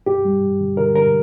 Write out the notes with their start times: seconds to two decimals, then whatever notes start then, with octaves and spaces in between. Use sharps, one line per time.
0.06 G2 G4
0.25 G3
0.42 G2
0.60 D3
0.77 D3 A#4
0.96 D3 A#4